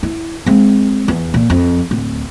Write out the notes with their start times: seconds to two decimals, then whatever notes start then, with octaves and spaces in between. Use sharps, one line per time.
0.03 E4
0.46 G#3 C4
1.08 E2
1.34 A#2
1.50 F2
1.91 D1